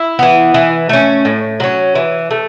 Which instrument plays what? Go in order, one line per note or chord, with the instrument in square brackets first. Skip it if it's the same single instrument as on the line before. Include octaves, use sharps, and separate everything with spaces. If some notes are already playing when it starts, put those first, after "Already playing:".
Already playing: [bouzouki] E4
E3 B3
E3
A3 C#4
A2
F#3 C#4
E3
A3